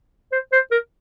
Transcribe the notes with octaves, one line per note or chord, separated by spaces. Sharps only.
C5
C5
A#4